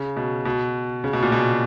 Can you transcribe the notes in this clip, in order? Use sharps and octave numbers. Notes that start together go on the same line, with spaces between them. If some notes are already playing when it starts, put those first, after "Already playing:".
Already playing: C#3
B2
B2
C#3
B2
A#2
B2